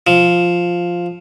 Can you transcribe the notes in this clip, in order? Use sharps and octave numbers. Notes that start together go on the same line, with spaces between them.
F3